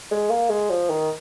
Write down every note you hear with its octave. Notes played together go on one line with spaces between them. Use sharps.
G#3
A#3
G#3
F3
D#3